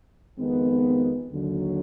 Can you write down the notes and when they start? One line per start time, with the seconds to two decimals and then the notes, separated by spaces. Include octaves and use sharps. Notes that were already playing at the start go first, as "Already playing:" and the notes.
0.38 F2 D#3 G#3 B3
1.32 D#2 D3 F#3